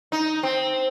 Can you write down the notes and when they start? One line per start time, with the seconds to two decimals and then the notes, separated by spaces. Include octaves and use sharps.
0.12 D#4
0.43 C4